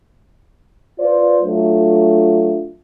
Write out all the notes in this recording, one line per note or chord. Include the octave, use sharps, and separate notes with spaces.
F4 B4 C5 D5
F#3 A3 D4 F4